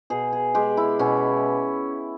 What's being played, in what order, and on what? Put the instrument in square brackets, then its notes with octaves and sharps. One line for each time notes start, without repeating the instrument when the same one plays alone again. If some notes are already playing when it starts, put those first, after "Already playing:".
[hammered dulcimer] B2 G#4
G#4
G#3 G4
E4
B2 C#4